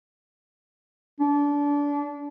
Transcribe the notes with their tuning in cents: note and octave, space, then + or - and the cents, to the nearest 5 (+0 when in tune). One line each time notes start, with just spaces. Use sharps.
D4 -25